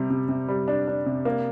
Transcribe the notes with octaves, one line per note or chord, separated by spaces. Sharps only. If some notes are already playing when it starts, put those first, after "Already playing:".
Already playing: C3 G3
C3
C3
G3
D4
D4
C3
A#3